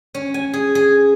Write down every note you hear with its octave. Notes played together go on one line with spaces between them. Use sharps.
C#4
G#5
G#4
G#4